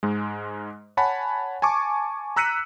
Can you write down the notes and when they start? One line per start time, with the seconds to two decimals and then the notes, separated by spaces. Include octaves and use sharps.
0.03 G#2 G#3
0.97 C#5 F#5 G#5 A5 B5
1.62 G#5 A5 C#6 D6
2.36 A#5 E6 F#6 B6 C#7 D#7